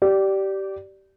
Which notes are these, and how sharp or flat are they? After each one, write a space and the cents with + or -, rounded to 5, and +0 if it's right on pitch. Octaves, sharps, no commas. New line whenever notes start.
G4 -20 D5 +0